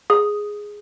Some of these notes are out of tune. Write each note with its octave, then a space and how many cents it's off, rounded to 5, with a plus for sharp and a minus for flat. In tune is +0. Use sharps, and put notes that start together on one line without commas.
G#4 +0 D#6 +0